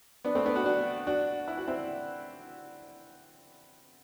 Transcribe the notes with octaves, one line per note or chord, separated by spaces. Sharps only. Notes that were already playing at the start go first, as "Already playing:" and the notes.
B3 D4
A3 C4
B3 D4
D4 F#4
D4 F#4
D4 F#4
E4
F#4
C4 E4